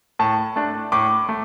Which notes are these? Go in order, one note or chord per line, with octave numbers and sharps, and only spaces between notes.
A2 A5
A3 D4
A2 D6
A3